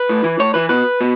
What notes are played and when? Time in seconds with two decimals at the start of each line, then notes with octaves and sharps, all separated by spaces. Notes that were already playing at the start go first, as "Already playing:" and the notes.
Already playing: B4
0.09 A2
0.24 E3
0.39 A2 C#5
0.54 E3 B4
0.69 B2 B4
1.01 B2